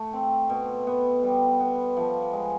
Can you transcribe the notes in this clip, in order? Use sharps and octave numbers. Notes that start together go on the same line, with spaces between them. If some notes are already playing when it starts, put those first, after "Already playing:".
Already playing: A3
C4
B2
B3
G3
B3
F3
G#3